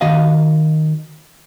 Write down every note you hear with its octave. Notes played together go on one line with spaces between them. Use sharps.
D#3 F#4 D#5 F5